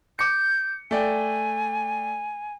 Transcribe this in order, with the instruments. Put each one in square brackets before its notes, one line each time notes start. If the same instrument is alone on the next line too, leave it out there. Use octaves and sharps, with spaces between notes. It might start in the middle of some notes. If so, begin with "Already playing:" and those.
[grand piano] D6 C#7 [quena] G6
[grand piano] A3 D5 G5 [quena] G#5